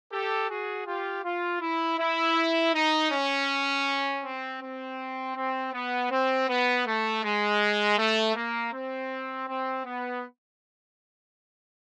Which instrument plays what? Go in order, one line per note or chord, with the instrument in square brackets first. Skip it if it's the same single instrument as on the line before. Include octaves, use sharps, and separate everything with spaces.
[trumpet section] G4 A4
F#4 G#4
F4 G4
F4
E4
E4
D#4
C#4
C4
C4
C4
B3
C4
B3
A3
G#3
A3
A#3
C4
C4
B3